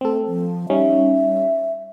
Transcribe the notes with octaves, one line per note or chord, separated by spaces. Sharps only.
A3 C4 A4
F3
G3 C#4 D#4 E5